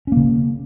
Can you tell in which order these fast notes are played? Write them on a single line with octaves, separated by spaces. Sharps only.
C#4 A#3 C#3